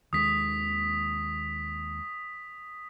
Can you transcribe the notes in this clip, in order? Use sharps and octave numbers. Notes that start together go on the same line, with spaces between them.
D#2 D#3 G#3 D#6 B6